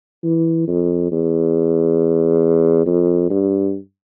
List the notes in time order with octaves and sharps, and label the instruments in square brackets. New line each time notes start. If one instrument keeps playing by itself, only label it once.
[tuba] E3
F2
E2
F2
G2